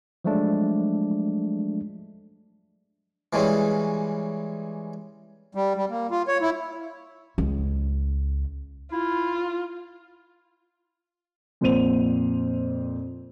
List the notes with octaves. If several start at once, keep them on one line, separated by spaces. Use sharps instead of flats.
F3 F#3 G#3 A3 D4
E3 G3 G#3 C#4
G3
G3
A#3
F4
C#5
E4
C#2
E4 F4
F2 A#2 C4 C5 D#7 F7